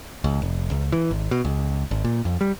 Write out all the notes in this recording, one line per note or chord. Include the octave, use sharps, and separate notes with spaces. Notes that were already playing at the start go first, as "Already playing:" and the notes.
C#2
F1
C#2
E3
G#1
B2
C#2
G#1
A#2
F2
G3